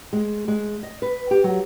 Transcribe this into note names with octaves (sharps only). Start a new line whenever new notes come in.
G#3
G#3
D#5
B4
G4
F#3